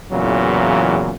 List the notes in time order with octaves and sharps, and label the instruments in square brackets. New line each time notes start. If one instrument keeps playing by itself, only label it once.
[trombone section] E2 A#2 C#3 E3 F#3